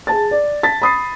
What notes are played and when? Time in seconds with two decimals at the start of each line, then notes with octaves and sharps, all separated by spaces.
0.07 G#4 A5 A6
0.31 D5
0.63 A5 A6 B6
0.82 B5 D#6 C7